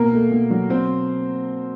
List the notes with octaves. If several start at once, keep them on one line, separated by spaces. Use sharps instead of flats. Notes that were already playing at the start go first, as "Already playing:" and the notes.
Already playing: B2 A#3 A#4
A3
B2
F#3
B2 C4 C5